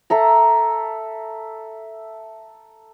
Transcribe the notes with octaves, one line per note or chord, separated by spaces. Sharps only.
A4 E5 A#5